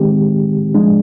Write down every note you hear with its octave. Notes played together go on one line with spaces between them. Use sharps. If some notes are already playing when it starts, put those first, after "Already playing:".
Already playing: D#3 G#3 C4 G4
F3 G#3 D4